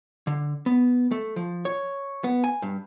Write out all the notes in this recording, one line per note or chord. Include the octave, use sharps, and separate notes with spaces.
D3
B3
A3
F3
C#5
B3
G#5
G2